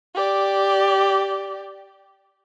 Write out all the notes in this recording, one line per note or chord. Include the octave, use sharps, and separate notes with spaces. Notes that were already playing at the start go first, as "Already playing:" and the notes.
G4 D5